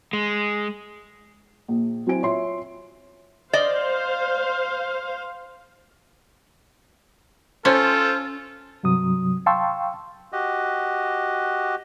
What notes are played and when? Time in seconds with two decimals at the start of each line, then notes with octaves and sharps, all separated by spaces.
0.13 G#3
1.68 A#1
2.07 F#3 C4 E4 C5 G#5 D7
2.22 F4 C#5 E5 C6
3.53 C5 D5 D#5 F5
7.65 C#4 F4 A4 C5
8.83 G2 C3 F#3 D#6
9.46 F5 G5 A5 C6 C#6 E6
10.33 F#4 G4 D#5